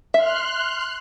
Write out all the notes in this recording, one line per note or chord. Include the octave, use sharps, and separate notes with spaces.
E5 C6 F6 F#6